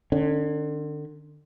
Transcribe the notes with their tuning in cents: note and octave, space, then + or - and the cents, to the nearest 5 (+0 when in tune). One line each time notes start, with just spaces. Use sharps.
D3 +40 C#4 +0